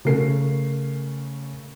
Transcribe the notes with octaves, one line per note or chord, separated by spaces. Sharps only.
C#3 A3 A#4 C7